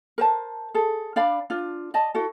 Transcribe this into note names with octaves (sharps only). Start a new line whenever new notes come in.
A#4 C5 A5
G#4 A4
D4 D5 F5 B5
D4 F4
D5 D#5 A5
E4 F#4 A4